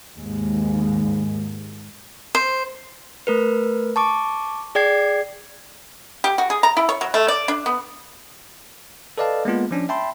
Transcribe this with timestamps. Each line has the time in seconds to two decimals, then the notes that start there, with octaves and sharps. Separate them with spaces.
0.16 D#2 G#2 G#3
2.35 C5
3.27 A3 A#4 B4
3.96 A5 C#6 D6
4.75 G#4 D5 G5 G#6 C7
6.24 G4
6.38 F#4
6.50 G#4
6.63 A#5
6.77 E4
6.89 C#5
7.01 F#3
7.14 A3
7.28 D5
7.48 D4
7.66 B3
9.18 A4 B4 D5 D#5 F5 A5
9.45 G#3 A#3 B3 F4
9.71 F3 C#4 D4
9.89 E5 G5 A5 B5 C6